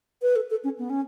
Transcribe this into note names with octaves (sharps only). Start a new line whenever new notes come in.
B4
A4
A4
C#4
B3
C#4